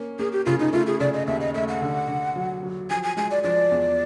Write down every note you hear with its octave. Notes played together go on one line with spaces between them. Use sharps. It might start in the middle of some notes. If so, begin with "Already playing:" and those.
Already playing: A#3 C#4
A#3 G#4
G4
C#3 F4
D#4
A3 F4
G#4
C#3 D5
D#5
D#2 E5
D#5
A3 E5
F#5
D3
D3
F#3
F#3
F3 G#5
G#5
G#3 G#5
D5
F3 D5
E2